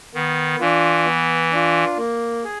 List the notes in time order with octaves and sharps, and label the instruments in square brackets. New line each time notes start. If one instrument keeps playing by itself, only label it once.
[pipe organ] D#3 [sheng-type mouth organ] B3
[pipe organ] E3 [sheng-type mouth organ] D4 F4
[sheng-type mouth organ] B3
D4 F4
A#3
G#4